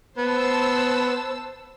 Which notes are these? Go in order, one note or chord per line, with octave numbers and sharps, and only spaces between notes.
B3 C5 A5 E6